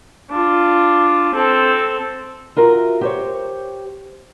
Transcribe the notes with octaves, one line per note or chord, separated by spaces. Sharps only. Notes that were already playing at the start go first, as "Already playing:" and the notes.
D4 F4
C4 A4
F4 F#4 A#4 E5
G4 C5 C#5